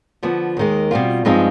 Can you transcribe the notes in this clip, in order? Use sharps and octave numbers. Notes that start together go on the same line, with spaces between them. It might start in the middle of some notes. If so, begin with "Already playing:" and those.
D3 F3 B3
D#2 D#3 G#3
B2 G3 C4 F4
G2 F3 G#3 C4 D#4